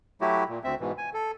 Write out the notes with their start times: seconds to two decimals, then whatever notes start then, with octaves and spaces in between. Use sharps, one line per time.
0.21 F#3 A3 E4 F#4 G4
0.49 A#2
0.64 D2 C4 E5
0.80 G#2 B2 E3
0.98 G#5
1.14 A4